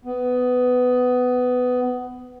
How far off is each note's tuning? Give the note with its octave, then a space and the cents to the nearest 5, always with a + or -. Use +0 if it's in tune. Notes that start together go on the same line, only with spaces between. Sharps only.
B3 +15